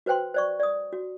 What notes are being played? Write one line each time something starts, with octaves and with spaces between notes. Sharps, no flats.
F#4 B4 C5 G5 C6
C5 D5 C#6
D5 D#6
F#4